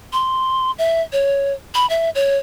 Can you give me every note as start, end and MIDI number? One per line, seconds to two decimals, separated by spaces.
0.13 0.72 84
0.78 1.02 76
1.12 1.53 73
1.74 1.88 83
1.90 2.10 76
2.15 2.38 73